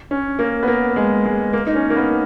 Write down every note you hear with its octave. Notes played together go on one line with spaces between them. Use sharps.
C#4
A#3
B3
A#3
G#3
G#3
A#3
D#4
C#4
A#3
B3